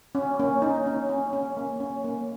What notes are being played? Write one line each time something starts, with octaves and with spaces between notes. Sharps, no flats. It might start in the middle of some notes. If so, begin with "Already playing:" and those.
C#4
A#3 C#4
C#4 D#4
C#4
C#4
C#4
A#3
C#4
A#3